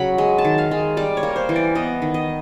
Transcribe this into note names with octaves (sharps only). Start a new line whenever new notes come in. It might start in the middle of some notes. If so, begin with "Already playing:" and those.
Already playing: C#3 F#3 B5
G#3
A5
D#3
F5
G#3
G3 D5
C#5
A#3
C5
E3
D5
B3 D#5
D#3
D#5